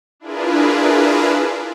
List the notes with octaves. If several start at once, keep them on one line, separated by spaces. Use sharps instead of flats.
D4 E4 F4 G#4 A#4 B4